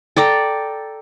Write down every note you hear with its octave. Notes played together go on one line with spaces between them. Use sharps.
A4 D5 G5 A#5